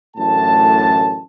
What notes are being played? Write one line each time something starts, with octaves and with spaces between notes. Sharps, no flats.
A1 F#2 A2 D3 A5